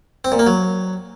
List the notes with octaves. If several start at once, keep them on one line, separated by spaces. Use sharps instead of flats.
C4
A#2
A#3
F#3